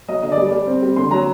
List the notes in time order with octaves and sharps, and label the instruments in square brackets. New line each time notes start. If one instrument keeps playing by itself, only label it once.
[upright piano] F#3 D#5
D3 D#5
D5
G3
G3 D5
C4
G3
D3 C6
F#3 A#5